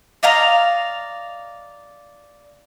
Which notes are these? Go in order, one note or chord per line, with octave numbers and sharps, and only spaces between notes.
D5 D#5 F5 A#5